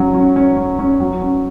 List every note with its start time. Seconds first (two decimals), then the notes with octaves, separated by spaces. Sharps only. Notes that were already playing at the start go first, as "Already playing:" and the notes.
Already playing: F#3 C#4
0.14 C#4
0.36 C#4
0.57 C#4
0.79 C#4
1.00 F#3
1.21 C#4